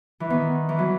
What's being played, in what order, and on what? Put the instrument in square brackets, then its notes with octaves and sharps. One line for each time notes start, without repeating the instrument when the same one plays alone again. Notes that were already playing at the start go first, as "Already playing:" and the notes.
[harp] E3
[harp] D#3 [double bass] B3
[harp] E3
F#3